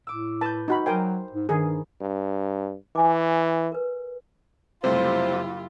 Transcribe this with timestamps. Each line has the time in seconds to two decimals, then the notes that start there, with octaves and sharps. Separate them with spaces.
0.07 A2 D6 E6
0.41 B4 A5 G6
0.68 D#4 F#4 B5
0.86 F#3 A#4 C5 G5 G#5
1.32 G#2
1.49 G2 D#3 G#4
2.01 G2
2.95 E3 E5 G#5 D6
3.72 A#4 B4
4.84 F#1 C3 G3 A3 E4 F4 G4 C5